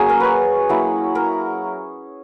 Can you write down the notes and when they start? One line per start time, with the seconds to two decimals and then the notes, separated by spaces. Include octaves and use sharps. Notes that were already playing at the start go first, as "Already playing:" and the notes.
Already playing: F#3 A#3 C#4 G#4
0.09 A#4
0.20 B4 C#5
0.69 F#3 A#3 E4
1.15 A#4